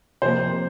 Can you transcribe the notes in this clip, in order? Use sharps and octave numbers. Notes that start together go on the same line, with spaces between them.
C3 F3 A#3 C5